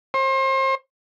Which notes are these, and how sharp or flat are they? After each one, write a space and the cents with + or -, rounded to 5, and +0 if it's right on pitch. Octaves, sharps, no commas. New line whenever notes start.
C5 +35